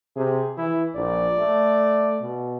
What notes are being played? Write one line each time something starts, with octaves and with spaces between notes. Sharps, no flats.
C3 G#4
E3 E4
A#1 D5
A3
B2